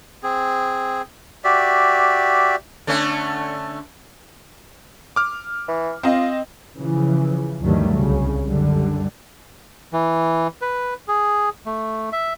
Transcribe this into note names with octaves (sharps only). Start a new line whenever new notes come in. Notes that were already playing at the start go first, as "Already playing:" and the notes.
C4 G#4
F#4 G4 D5 E5
D3 A3 C#4
D6 F6
E3
C4 F4 D#5
C#3 E3 F3
D2 G2 D#3 F#3 G3 A3
C2 C#3
F#2 D3 G3
E3
B4
G#4
A3
E5